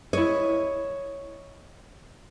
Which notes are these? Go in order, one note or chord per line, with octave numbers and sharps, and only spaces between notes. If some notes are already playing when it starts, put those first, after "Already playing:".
E4 C#5 D#5